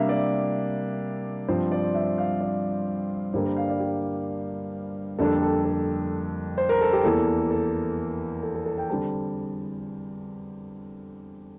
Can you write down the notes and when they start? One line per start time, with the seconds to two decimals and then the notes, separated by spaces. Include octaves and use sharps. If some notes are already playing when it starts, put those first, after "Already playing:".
Already playing: C3 G3 A#3 D4 E5 F5
0.09 D5
1.48 G2 F3 C4 C5
1.71 D5
1.95 E5
2.18 F5
2.41 D5
3.34 G2 D3 G3 A#3 D4 C5
3.45 A#4
3.57 F5
3.68 D5
3.80 G4
5.19 F2 D3 G3 A#3 D4 A4
5.42 A4
5.65 A4
6.58 C5
6.69 A#4
6.81 A4
6.93 G4
7.04 E2 E3 A#3 A4
7.51 A4
8.43 A4
8.55 A4
8.66 A4
8.78 G5
8.89 D3 G3 C4 A5